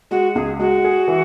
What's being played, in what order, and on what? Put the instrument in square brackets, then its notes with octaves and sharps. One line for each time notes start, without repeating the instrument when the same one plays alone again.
[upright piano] G#3 [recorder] F#4
[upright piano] C#2 [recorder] G#4
[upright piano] G#3 [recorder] F#4
[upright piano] G#4
E3